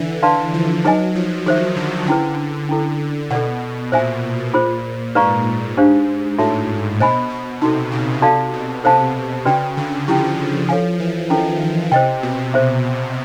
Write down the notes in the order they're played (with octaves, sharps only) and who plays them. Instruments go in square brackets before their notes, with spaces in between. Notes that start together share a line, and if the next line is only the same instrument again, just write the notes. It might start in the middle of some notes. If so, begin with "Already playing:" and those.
Already playing: [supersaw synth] D3 E3
[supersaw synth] E3 [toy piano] B4 D5 F5 A5 C6
[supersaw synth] F3
[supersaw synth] F#3 [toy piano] D#4 G#4 B4 D#5 G#5
[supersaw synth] F3
[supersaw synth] D#3 [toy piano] G#4 C5 E5
[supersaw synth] D3
[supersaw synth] D3 [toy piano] C#4 E4 G#4 B4
[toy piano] C#4 E4 A4
[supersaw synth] B2 [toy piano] A4 D5 F#5
[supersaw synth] A#2 [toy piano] C5 E5 G#5
[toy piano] F4 G#4 C5
[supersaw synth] G#2 [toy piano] B4 D5 F5 A#5 C#6
[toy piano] D4 G4 C5 F5
[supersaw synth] A2 [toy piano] F#4 A4 C#5 E5 A5
[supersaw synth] B2 [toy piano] C5 D#5 G#5 B5
[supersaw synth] B2
[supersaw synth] C3 [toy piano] D#4 F#4 A4
[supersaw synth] C#3
[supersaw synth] C3 [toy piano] F#4 A4 D5 F5 A5
[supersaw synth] B2
[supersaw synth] C3 [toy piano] A4 C5 F5 A5
[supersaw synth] C#3 [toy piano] C#4 F#4 B4 D5 G5
[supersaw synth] D3
[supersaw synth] F3 [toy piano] C#4 E4 G4
[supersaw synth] F3 [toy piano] A4 C#5 F5 G#5
[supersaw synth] E3
[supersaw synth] D#3 [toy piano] C#4 E4 A4
[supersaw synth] C3 [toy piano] C5 D#5 G5
[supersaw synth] B2
[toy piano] G#4 C5 E5